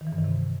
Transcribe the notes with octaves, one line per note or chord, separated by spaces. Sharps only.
D#3
E3
G2
D#3
C3